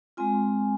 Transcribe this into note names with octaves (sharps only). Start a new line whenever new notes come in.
G#3 C4 F4 G#5